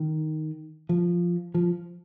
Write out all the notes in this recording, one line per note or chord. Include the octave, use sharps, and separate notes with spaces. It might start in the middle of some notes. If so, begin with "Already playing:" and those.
Already playing: D#3
F3
F3